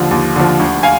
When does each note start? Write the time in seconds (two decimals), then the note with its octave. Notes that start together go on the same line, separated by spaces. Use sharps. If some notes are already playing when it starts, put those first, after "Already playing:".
Already playing: D#2 D3 F3
0.11 D#2
0.36 D3 F3
0.59 D2
0.83 F5 G#5